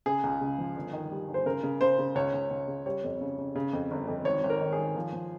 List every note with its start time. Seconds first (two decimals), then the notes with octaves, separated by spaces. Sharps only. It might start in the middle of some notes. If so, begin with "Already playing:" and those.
0.06 C#3 G#4
0.23 C#2
0.41 C#3
0.58 F3
0.76 G1
0.93 D#3
1.11 G3
1.28 G1
1.34 C5
1.46 C#3 A#4
1.63 C#3
1.81 C#3 C5
1.99 C#3
2.15 C#2 C#5
2.34 C#2
2.51 C#2
2.68 C#3
2.86 G3 C#5
3.04 F2
3.21 C#3
3.38 C#3
3.55 C#3
3.73 F2
3.91 G1
4.08 F2
4.25 G#1 C#5
4.44 G#1
4.50 A#4
4.61 D#3
4.72 G#4
4.78 G#1
4.96 F3
5.13 F3